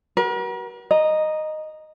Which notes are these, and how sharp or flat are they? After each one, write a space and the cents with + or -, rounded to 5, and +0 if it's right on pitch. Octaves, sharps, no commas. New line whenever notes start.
F#4 +35 A#4 +45
D#5 -10 A#5 +15